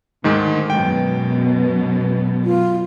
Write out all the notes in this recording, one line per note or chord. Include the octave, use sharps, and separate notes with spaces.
D2 G#2 D#3 G#3
F#2 B2 G#3 G5
F4